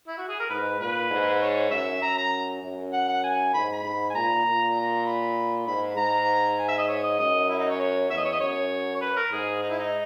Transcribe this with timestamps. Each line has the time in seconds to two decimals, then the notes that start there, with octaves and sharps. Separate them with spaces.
0.08 E4
0.18 F#4
0.29 G#4
0.40 A#4
0.50 G#2 B4
0.80 A#2 B4
1.10 G#2
1.41 C#5
1.71 F#2 E5
2.02 F#2 A#5
2.17 A#5
2.63 F#2
2.93 F#5
3.08 F#5
3.24 G#5
3.54 G#2 B5
3.73 B5
3.84 G#2
4.10 G#5
4.15 A#2 A#5
4.45 A#2
4.76 A#5
5.06 B5
5.67 G#2 B5
5.97 G#2 A#5
6.58 G#5
6.68 E5
6.78 D#5
6.88 C#5
7.04 D#5
7.19 F#2 D#5
7.50 E4
7.59 D#4
7.70 C#5
7.80 C#5
8.10 E2 E5
8.17 D#5
8.25 C#5
8.32 D#5
8.40 F#2 C#5
8.95 C#5
9.01 B4
9.16 A#4
9.31 G#2 G#4
9.62 D#4
9.70 E4
9.79 D#4